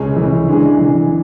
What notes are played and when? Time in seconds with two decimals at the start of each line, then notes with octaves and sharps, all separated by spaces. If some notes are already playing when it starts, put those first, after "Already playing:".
Already playing: C#2 C#3 G#3 C#4 G#4
0.16 E3
0.48 D3 E3 G#3 D4 G#4
0.79 E3